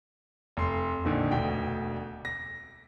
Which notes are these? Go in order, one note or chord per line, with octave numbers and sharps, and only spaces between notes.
F1 C6
A#1 D3 D#3 F3
E1 D2 B2 G5
A#6